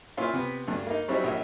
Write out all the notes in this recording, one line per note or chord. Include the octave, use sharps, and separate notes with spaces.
A#2 C#4 E4 F4 C6
C3 B3
D2 G2
A#3 D#4
F#3 G3 C4 C#4 D#4 E4
A#1 C#5 D#5 E5